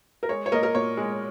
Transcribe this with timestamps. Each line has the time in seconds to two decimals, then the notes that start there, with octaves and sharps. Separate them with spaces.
0.23 A#4
0.29 G#3 C#5
0.46 C#5
0.52 A#2 A#4 D#5
0.63 A#4
0.74 A#2 C#5
0.97 G#3